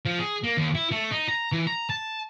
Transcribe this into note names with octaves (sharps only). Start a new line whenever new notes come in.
F3
G#4
A#3
D#2
E4
A3
D#4
A#5
E3
A#5
A5